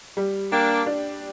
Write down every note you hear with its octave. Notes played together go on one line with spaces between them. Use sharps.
G3
A#3 D4 G4
D4